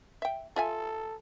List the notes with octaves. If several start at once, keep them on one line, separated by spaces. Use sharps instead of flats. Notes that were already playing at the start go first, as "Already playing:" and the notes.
E5 G5
F4 A4 E5 G#5